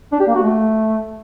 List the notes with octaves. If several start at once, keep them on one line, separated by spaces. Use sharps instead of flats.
D4
G4
A#3
F#4
A3